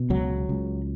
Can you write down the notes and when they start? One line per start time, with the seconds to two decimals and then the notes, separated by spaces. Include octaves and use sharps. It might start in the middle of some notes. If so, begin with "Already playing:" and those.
Already playing: B2
0.10 C#2 F#3
0.49 C#2